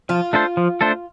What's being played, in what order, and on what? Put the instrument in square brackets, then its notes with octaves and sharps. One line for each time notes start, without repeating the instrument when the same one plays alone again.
[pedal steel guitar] F3 [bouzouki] F4
[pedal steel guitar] A3 D4 A4 C5
F3
A3 D4 A4 C5